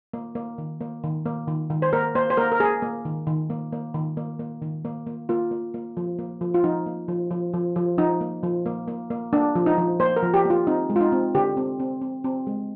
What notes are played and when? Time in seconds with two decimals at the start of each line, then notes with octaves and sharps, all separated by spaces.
0.14 A#3
0.35 A#3
0.58 D#3
0.81 A#3
1.04 D#3
1.26 A#3
1.48 D#3
1.70 D#3
1.82 C5
1.93 A#3 A#4
2.15 A#3 C5
2.30 C5
2.37 A#3 A#4
2.52 A#4
2.60 A#3 G#4
2.82 A#3
3.05 D#3
3.27 D#3
3.50 A#3
3.72 A#3
3.94 D#3
4.17 A#3
4.39 A#3
4.62 D#3
4.85 A#3
5.07 A#3
5.29 A#3 F4
5.51 A#3
5.74 A#3
5.97 F3
6.19 A#3
6.41 F3
6.54 F4
6.64 F3 D#4
6.86 A#3
7.08 F3
7.31 F3
7.53 F3
7.76 F3
7.98 F3 D#4
8.21 A#3
8.43 F3
8.66 A#3
8.88 A#3
9.10 A#3
9.33 A#3 D4
9.55 F3
9.66 D#4
9.78 F3
10.00 A#3 C5
10.16 A#4
10.22 F3
10.34 G4
10.45 A#3 F4
10.67 C4 D#4
10.90 G#3
10.96 F4
11.01 D#4
11.12 C4
11.35 D3 G4
11.57 C4
11.80 C4
12.02 C4
12.24 C4
12.47 G#3